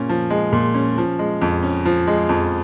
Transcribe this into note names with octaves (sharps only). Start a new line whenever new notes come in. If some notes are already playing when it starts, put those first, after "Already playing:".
Already playing: A#2 C#4
F3
G#3
A#2
C#4
F3
G#3
F2
C#4
F3
G#3
F2